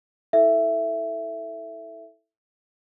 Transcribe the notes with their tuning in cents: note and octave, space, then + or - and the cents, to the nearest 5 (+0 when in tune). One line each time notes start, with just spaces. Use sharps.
E4 -15 A4 +0 E5 +10